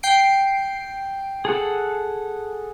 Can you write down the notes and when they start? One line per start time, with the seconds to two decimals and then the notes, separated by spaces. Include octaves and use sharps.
0.03 G5 C7 D7
1.45 G#4 A4 F#5